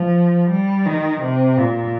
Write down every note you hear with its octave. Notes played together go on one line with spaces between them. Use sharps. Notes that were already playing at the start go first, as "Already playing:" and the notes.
Already playing: F3
G3
D#3
C3
A#2